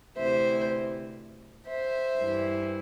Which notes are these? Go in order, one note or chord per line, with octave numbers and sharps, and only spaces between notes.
D2 C3 E3 C5 E5
C5 E5
G2 E3